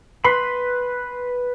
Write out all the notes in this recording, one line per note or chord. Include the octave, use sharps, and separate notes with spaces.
B4 B5 C6